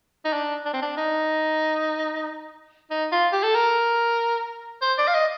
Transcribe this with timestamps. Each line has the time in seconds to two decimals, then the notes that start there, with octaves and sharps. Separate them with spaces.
0.25 D#4
0.33 D4
0.66 D4
0.74 C4
0.82 D4
0.97 D#4
2.90 D#4
3.12 F4
3.33 G4
3.43 A4
3.55 A#4
4.82 C5
4.98 D5
5.07 F5
5.14 D#5